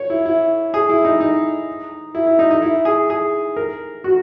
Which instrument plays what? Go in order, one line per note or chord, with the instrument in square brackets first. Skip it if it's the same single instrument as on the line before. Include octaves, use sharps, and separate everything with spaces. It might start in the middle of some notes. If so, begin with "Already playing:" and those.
Already playing: [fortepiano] C#5
E4
E4
G#4
E4
D#4
D#4
E4
E4
D#4
D#4
E4
G#4
G#4
A#4
F#4